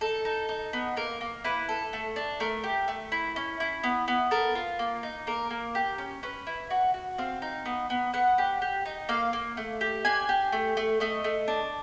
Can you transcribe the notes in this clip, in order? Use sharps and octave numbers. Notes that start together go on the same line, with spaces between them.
D#4 A4
D#4
D#4
B3
A#3 A#4
A#3
E4 B4
A4
A3
D4
A3 A#4
G4
A3
E4
C#4
E4
B3
B3
A4 A#4
F4
A#3
D#4
A#3 A#4
A#3
G4
C#4
C#4 B4
E4
F#4
F#4
C4 F5
D#4
B3
B3
B3 F#5
G4
G4
D#4
A#3 F5
A#3
A3
G4
D4 G#5
G4
A3
A3
A3 D#5
A3
D4